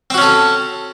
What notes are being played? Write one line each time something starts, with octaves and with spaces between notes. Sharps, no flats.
C4 C#4 F#4 A4